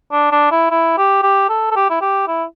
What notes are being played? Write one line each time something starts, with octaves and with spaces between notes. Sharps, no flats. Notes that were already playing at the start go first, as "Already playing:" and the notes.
D4
D4
E4
E4
G4
G4
A4
A4
G4
E4
G4
E4